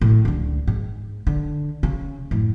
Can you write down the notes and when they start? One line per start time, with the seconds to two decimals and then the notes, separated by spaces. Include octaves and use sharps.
0.01 A2
0.25 C#2 D3
0.67 G#2
1.27 D3
1.83 C#3
2.31 F#2 A2